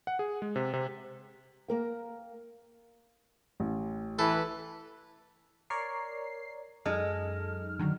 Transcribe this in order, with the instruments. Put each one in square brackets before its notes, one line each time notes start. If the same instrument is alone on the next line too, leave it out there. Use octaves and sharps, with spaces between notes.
[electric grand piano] F#5
G#4
G#3
C3
C3
[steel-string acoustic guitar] A#3 A#4 G5
[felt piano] A1
[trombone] E3 [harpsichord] A4 [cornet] B4
[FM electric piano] A#4 C#5 D5 [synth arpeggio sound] C7
[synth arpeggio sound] F#2 D#4 F6 [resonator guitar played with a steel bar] G#3 [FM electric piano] A4
[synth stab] D3 D#3 F#3